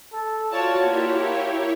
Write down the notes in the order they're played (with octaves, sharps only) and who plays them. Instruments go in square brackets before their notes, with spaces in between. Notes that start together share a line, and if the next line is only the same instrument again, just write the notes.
[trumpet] A4
[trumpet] F4 [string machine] F#4 [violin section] C#5 D5 A5
[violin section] A#3 [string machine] E4 G4 C#5